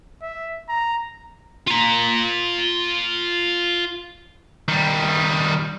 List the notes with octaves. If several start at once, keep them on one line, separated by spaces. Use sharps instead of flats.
E5
A#5
F4 A#5
D#3 G3